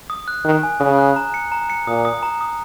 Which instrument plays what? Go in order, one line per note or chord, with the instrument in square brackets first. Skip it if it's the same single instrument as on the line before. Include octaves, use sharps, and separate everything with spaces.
[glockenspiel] D#6
F#6
[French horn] D#3 [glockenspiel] F#6
[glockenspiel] G#5
[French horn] C#3 [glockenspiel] D#6
[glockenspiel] F#6
A#5
C#7
A#5
C#7
[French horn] A#2 [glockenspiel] D#6
[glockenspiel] D#6
A#5
D#6